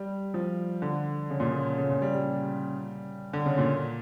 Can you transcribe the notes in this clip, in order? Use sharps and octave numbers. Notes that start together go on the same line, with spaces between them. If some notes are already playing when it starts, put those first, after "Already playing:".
Already playing: G3
F3
D3
C#3
A#2
C#3
C#3
A#2
G3
G3
D3
C#3
A#2